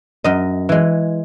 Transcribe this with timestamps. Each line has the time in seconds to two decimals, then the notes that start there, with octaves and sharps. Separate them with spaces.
0.24 F#2 D#5
0.69 E3 G#3